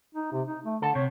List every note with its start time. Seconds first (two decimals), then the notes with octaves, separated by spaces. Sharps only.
0.15 D#4
0.32 C3
0.48 D#4
0.65 A3
0.82 D3 A4
0.95 C3 C#5